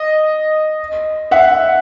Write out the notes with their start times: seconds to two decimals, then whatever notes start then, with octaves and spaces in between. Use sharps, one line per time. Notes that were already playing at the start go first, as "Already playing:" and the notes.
Already playing: D#5
1.31 E5 F#5